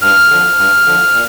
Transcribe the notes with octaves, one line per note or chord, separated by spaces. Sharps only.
G2 F6
D3 F3
G2
D3 F3
A#2